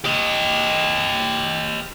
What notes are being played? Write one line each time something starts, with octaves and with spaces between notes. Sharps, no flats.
G4 D#5